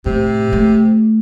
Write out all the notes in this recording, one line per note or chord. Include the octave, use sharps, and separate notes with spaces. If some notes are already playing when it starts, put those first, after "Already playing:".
A2 C3
A3